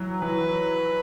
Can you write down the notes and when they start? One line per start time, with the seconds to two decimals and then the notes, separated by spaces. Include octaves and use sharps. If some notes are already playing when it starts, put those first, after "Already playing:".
Already playing: E3 F#3
0.22 E3 B4